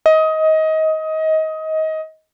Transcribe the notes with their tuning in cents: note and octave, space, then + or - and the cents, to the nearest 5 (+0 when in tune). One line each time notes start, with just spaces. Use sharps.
D#5 +25